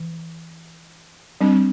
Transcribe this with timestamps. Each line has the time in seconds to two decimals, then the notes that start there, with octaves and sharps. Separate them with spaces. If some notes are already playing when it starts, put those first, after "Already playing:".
Already playing: E3
1.41 G3 C4 D4